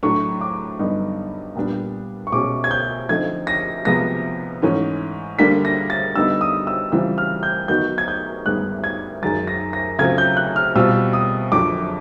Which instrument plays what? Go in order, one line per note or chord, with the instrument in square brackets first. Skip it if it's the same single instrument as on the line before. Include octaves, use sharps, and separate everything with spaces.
[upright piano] A2 F#3 A3 D4 [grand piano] C#6
[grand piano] D6
[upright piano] G2 D3 F#3 B3 D#4
A#2 G3 B3 D4
[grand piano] C#6
[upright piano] B2 G#3 C#4 F#4 [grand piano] D6
[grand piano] G#6
G6
[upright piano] D3 F3 A3 C4 D#4 [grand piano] G#6
[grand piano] A#6
[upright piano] C3 F3 G#3 B3 [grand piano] A#6
[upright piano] G#2 E3 A3 C#4
[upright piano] D3 G3 A#3 D4 [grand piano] B6
[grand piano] A#6
A6
[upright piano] D3 G3 B3 D#4 [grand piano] E6
[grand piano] D#6
E6
[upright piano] C#3 E3 G3 C4 F4 [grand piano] E6
[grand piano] F6
G6
[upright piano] D#3 F#3 B3 D#4 F#4 [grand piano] G6
[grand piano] G#6
G6
[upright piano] G2 D#3 G#3 B3 [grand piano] F#6
[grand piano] G#6
[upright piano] F#2 D#3 G#3 [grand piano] A6
[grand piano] A#6
A#6
[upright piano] C#3 F#3 A3 C4 F4 [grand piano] G#6
[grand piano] G6
F#6
F6
[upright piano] B2 G3 C4 F4 [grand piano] E6
[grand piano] D#6
[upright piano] F2 D3 F#3 [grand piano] D6